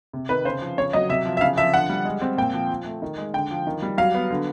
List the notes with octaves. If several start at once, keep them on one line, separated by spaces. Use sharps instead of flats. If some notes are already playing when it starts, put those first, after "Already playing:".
C3
D#3 B4
C#3 C5
F3
C#3 C#5
F#3 D#5
C3 E5
F3
E5
C#3 F5
F3 E5
D3 F#5
G3
G#3
C4
A#2 G5
F3
F3
A3
D#3
G#3
D3 G5
F3
D#3
G3
F#3 F5
B3
D3